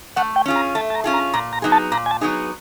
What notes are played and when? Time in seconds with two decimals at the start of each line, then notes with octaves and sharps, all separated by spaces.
0.16 A3 F#5
0.36 G5
0.46 C#4 F4 G#4
0.56 A#5
0.75 A3 A5
0.90 A5
0.95 A#5
1.04 C#4 F4 G#4
1.14 A#5
1.34 A#2 A#5
1.53 A#5
1.62 F#3 B3 D#4 G#4
1.72 A5
1.92 A#2 A#5
2.06 G#5
2.11 A5
2.21 F#3 B3 D#4 G#4